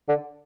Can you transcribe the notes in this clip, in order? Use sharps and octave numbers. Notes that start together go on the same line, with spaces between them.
D3